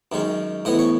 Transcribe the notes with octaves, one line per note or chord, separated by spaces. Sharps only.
F#2 D#3 G#3 C#4
A2 E3 B3 D#5
C#5